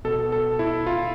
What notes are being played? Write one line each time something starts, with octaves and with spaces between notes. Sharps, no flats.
B2 A4
A4
E4
F4